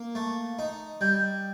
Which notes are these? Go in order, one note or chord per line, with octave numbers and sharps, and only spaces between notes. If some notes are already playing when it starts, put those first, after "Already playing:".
Already playing: A#3
A3
D#4
G3 G6